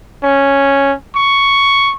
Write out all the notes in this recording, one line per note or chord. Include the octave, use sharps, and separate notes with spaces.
C#4
C#6